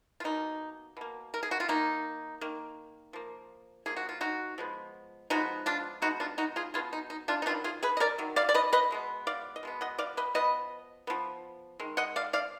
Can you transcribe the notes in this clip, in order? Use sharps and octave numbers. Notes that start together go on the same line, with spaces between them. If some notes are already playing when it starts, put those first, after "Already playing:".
F4
B2 A#3 D#4
B2 A#3
A#4
G#4
F#4
F4
D#3 A#3 D#4
D#3 A#3
F3 A#3
F3 A#3 G#4
F#4
F4
D#4 F#4
F3 G#3 B3
F3 G#3 B3 D#4 F#4
D4 F4
B2 G#3 B3 D#4 F#4
D4 F4
D#4 F#4
F4 G#4
B2 G#3 B3 F4 G#4
D#4
D#4
D4 F4
D#4
D#3 F#3 B3 D4 F4
F4 G#4
G#4 B4
D#5
A#4 D5
D#3 F#3
D5 F5
D5
B4 D#5
B4 D#5
B2 G#3 B3
D5 F5
D#5
B2 G#3 B3
D#5 F#5
D5 F5
B4 D#5
F3 B3 B4 D#5
F3 B3
D#3 G#3
D#5 F#5
D5 F5
D5 F5